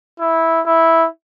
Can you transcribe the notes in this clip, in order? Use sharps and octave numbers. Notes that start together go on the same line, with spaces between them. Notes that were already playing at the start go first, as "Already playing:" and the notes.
E4
E4